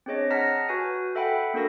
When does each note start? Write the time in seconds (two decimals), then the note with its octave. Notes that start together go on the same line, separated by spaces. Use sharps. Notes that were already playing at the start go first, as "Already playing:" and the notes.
0.06 C4 D4 G#4 C#5 D#5
0.30 F#5 A5 A#5 F6 A#6 B6
0.69 F#4 B4 G#5
1.15 A4 E5 F#5 G5 B5
1.54 A#3 D4 F#4 A4 A#4 A#6